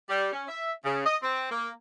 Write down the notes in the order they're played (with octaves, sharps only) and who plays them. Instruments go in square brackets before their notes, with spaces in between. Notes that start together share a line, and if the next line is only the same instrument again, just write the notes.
[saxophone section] G3
C#4
E5
C#3
D#5
C4
A#3